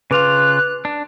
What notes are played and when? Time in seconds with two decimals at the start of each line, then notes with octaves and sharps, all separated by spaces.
0.11 C#3 F4 B4 D6 F#6 F7
0.85 D4